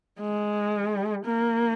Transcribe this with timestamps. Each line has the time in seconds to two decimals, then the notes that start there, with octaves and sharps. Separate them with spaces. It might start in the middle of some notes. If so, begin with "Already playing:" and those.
0.20 G#3
1.25 A#3